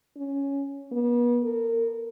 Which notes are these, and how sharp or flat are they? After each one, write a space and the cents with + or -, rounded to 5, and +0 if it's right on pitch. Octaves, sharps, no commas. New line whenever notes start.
C#4 +5
B3 -40
A#4 -30